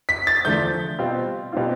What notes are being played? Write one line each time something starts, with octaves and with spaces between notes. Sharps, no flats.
B6
A6
E2 D3 F3 A3 D4 G6
B2 G3 C4 F4
B2 G3 C4 F4